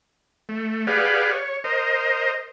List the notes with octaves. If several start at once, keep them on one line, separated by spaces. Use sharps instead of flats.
A3
G4 G#4 B4 D5 F5 F#5
C#5
A#4 C5 D#5